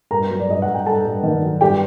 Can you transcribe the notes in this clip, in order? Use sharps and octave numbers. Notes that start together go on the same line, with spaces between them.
G2 A#4 A#5
F#3
D5
G2 D#5
F#5
G2
G5
G2 A4 A5
G2
D#3
F#3
G2 G4 G5